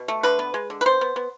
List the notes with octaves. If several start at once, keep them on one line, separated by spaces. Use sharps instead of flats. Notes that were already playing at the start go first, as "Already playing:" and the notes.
Already playing: B2
A3
D3 B4
B3
G#3
D3
B4
B3 C5
B3
B3